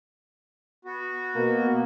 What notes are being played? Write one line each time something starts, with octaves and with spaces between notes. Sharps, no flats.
B3 F#4
B2 A#3